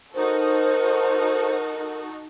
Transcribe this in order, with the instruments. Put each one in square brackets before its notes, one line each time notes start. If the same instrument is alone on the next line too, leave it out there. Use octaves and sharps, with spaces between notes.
[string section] D#4 F#4 A4 [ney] A#4 [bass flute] C5